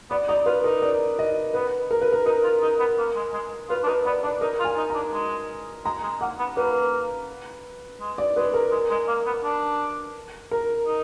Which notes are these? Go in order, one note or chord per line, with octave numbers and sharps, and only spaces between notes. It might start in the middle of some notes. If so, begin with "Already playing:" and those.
B3 D5
D#4 D5
F4 B4
D#4 A#4
D5
D#5
B3 B4
A#4
B4
A#4
D#4 A#4
F4
D#4
B3
A#3
G#3
G#3
F4 B4
D4
D#4 B4
B3 D5
D4 D5
D#4 A#4
F4
G#5
D#4
D4 A#5
G#3
G#3 A#5
G#3
A#3 F#5
B3
A#3 B4
G#3
D5
G#3 B4
A#4
G#3
G#3
A#3
B3
D4
A#4
D#4